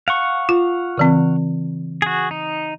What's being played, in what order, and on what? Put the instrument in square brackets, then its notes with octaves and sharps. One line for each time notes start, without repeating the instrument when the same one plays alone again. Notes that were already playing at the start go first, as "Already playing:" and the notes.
[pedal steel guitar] F5 F#5 C#6
[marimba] F4
C#3 E3 C4
[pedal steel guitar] F#4 G#4
D#4